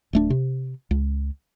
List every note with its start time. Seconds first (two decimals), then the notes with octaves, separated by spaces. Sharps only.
0.13 D1 A3 D4
0.30 C3
0.91 C#2